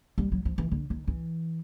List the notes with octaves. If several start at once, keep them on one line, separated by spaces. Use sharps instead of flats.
G3
F#3
F3
E3
D3
D#3
E3